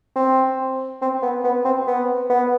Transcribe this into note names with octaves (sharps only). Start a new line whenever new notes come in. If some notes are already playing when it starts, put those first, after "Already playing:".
C4
C4
B3
B3
C4
B3
B3